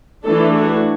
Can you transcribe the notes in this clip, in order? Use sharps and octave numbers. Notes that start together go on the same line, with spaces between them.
E3 A3 D4 A4
F#4